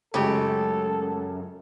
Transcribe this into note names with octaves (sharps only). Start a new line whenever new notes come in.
F#2 C#3 G#3 A3 G4 A4